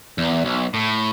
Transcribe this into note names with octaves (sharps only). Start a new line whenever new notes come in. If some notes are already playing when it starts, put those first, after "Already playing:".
E2
B1
A2